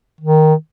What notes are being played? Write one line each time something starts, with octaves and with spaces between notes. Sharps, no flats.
D#3